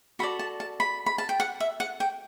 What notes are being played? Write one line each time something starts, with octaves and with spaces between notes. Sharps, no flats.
F#4 A4 D5 B5
A5
A5
B5
B5
A5
G5
F#5
E5
F#5
G5